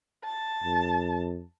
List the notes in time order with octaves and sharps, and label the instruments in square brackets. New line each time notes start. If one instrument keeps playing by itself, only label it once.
[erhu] A5
[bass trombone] F2